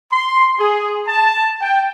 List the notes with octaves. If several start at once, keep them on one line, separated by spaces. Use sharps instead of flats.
C6
G#4
A5
G5